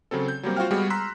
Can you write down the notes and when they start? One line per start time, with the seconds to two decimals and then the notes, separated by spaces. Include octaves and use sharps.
0.11 C#3 F#3 C4 A4
0.28 G6
0.43 F#3 G3 A#3 C4
0.56 F4 F#4 C5 F5 G5 F6
0.71 G3 G#3 B3 F#4 G#4
0.90 A#5 C6 E6 F#6 B6